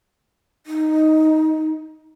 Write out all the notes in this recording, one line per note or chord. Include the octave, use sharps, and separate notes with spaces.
D#4